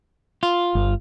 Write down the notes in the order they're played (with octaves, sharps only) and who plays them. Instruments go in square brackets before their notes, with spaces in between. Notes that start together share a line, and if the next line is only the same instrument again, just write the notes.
[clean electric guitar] F4
[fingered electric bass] G1